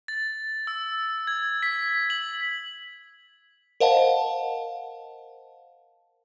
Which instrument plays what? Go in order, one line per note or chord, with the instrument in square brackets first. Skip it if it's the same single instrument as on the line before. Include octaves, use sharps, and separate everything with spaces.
[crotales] A6
E6
G#6
B6
F#7
[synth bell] A#4 C5 D#5 F5 F#5 A5